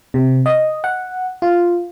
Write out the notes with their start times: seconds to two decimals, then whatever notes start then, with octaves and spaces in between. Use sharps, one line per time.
0.14 C3
0.46 D#5
0.84 F#5
1.42 F4